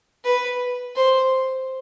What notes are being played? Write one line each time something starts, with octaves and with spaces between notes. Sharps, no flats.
B4
C5